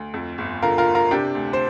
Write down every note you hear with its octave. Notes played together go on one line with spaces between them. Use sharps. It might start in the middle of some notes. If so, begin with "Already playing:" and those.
Already playing: D2
F2
G1
D3 F4 A#4
F4 A#4
G1
F4 A#4
C3 D4 G4
D2
C5